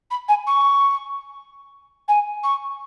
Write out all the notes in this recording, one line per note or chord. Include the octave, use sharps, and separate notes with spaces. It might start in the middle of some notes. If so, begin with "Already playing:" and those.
B5
G#5
C#6
G#5
C#6